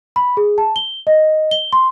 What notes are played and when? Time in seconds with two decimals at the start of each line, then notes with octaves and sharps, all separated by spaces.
0.16 B5
0.37 G#4
0.58 A5
0.76 G7
1.07 D#5
1.51 G7
1.73 C6